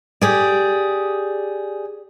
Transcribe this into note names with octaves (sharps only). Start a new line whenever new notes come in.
G4 G#4 D5